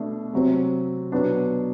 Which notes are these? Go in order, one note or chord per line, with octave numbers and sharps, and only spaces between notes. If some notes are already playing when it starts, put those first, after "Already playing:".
Already playing: B2 A3 D4
C3 F#3 C4
B2 F#3 B3 D4